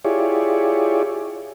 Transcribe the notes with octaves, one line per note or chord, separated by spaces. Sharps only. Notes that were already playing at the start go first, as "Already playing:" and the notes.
E4 F4 G4 G#4 C#5 D5